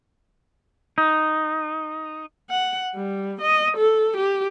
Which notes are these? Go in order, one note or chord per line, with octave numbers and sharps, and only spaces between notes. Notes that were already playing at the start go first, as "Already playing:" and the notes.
D#4
F#5
G3
D#5
A4
G4